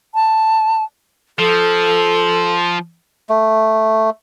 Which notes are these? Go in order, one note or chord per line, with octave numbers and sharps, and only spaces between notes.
A5
F3 A4
A3